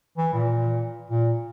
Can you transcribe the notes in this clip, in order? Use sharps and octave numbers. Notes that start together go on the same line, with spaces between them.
E3
A#2
A#2